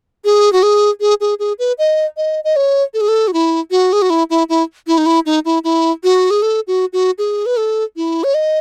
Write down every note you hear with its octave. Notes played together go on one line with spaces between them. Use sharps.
G#4
F#4
G#4
G#4
G#4
G#4
B4
D#5
D#5
D#5
C#5
A4
G#4
A4
F#4
E4
F#4
G#4
F#4
E4
E4
E4
E4
D#4
E4
D#4
E4
E4
F#4
G#4
A4
F#4
F#4
G#4
B4
A4
E4
C#5
D#5